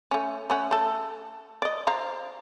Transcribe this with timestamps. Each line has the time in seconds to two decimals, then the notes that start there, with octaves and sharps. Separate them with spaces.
0.11 A3 C#4
0.50 A3 C#4 F#5
0.71 A3 A4
1.62 D5 D#5
1.87 C5 F5 A#5